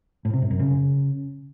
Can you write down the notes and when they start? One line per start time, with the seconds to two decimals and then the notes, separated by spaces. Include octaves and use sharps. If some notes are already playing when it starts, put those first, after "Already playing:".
0.25 A2
0.33 C3
0.42 G#2
0.51 F#2
0.59 C#3